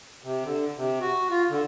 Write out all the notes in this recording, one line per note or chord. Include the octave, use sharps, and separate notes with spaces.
C3
D3
C3
F#4
F4
D3